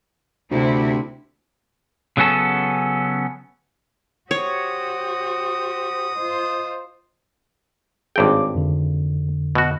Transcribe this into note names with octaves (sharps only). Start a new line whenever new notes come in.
D2 C3 E4
C#3 F#3 B3 C#4 A4
F#4 G4 C5 C#5 D#6
F4 C5 D#5
G#1 G2 G#4 C#5 G5 D6
F2 D3
B2 F#4